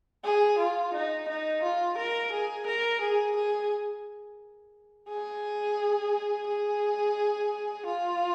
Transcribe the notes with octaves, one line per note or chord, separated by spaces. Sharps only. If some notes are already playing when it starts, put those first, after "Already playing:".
G#4
F4
D#4
D#4
F4
A#4
G#4
A#4
G#4
G#4
G#4
G#4
F4